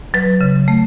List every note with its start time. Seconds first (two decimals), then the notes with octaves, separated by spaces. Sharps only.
0.14 F#3 B4
0.41 C#3
0.68 A3